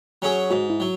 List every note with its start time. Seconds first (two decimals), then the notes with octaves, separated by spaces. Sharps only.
0.22 F#3 C#4 G#4
0.50 G#2 F#4
0.70 E4
0.80 F#3